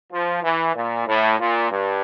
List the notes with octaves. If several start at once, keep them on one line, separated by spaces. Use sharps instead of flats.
F3
E3
A#2
A2
A#2
G2